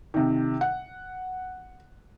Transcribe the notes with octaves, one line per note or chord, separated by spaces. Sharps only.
C3 D#3
F#5